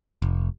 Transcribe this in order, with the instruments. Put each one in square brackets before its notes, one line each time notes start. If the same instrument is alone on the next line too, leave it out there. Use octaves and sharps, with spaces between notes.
[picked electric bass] F1